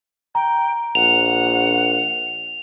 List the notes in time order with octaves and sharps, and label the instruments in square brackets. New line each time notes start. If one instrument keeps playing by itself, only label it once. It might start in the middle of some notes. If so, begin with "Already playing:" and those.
[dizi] G5 [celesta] A#5
[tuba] A#1 [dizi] F#5 [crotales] F7